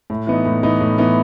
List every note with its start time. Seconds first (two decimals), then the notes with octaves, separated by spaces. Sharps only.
0.10 A2
0.27 E3 B3 D#4
0.45 A2
0.63 E3 B3 D#4
0.81 A2
0.98 E3 B3 D#4